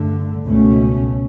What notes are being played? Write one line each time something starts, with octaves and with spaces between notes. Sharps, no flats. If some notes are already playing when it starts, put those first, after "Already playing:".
Already playing: G2 D3 A3
C#2 B2 A3 C#4